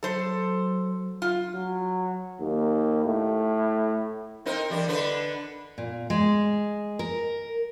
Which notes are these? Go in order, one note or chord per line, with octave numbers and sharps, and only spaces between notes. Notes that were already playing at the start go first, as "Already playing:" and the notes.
F#3 A4 C5
F4
F#3
D#2
A2
C4 D#4 A#4
E2 G3 D4
D3 D4 B4
A#2
G#3
A#4